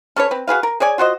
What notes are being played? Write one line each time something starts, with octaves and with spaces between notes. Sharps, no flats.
C#4 A4 B4 C#5
C4 B4
F#4 G#4 B4 F5
A#4
G#4 C#5 D5 G#5
F4 F#4 C5 D#5